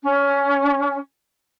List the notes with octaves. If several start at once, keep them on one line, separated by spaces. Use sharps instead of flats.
C#4